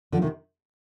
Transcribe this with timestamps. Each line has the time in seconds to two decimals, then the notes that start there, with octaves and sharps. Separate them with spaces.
0.12 D3 F3
0.22 C3 D#3